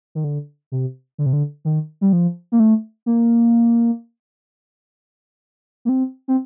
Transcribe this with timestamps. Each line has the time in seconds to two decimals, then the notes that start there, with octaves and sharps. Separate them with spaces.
0.15 D#3
0.24 D3
0.72 C3
1.18 D3
1.26 C3
1.33 D3
1.65 D#3
2.01 G3
2.13 F3
2.52 A#3
2.60 A3
3.06 A#3
5.85 A#3
5.89 C4
6.28 C4